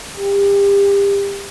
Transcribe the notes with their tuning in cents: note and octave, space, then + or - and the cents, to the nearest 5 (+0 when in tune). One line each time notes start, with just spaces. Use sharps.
G4 +30